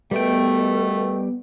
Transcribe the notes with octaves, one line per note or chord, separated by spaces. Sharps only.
B2 D#3 G3 A3 B3 A4 G5